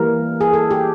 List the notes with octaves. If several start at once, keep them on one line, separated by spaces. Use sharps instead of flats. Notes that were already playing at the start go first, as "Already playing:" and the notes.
Already playing: E3 G3 A#3 A#4
G#4
A4
G4